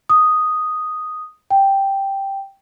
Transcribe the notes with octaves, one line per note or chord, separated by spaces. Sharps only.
D#6
G5